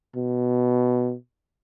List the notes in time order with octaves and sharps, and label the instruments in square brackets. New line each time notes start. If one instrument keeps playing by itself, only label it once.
[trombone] B2